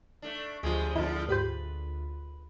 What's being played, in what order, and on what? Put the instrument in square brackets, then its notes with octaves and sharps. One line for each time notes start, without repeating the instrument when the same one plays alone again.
[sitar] A3 D4
[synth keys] D2 F4 [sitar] F3 G3 G#3
[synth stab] F#2 D#4 E4 [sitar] A2 D3 F3
[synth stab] G#2 G4 C5 [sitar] B4